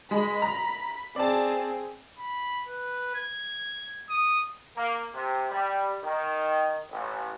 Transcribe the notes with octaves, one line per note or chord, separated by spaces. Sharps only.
G#3 B5
A#5
C4 G#4 D5 A5
B5
B4
G#6
D#6
A#3
C3
G3
D#3
A1